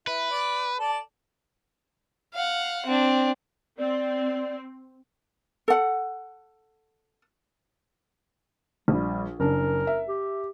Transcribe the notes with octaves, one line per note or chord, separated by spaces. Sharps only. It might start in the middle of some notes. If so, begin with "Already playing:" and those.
E4 B4
D5
A4 D5 A5
F5 F#5
C4 D4
C4 D5
A4 F#5
A#1 G3
F#1 D4 A#4
E5
G4